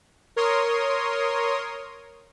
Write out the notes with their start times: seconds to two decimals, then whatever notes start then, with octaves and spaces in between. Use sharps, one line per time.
0.36 A#4 C#5 C6 D#6